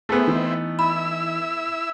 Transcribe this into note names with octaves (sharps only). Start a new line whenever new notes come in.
A3 B3 C4 E4 G#4
E3 D#4
E4 B5 E6